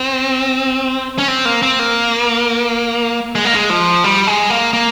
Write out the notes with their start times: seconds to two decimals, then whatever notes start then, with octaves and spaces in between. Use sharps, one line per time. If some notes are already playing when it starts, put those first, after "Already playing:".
Already playing: C4
1.18 C#4
1.28 C4
1.45 A#3
1.62 C4
1.79 A#3
3.35 G#3
3.45 A#3
3.55 G#3
3.70 F3
4.04 G3
4.27 G#3
4.50 A#3
4.73 A#3